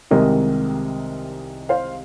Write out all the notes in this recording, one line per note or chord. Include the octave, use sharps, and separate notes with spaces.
C2 C3 D#3 G#3 A#4 D#5
C5 F5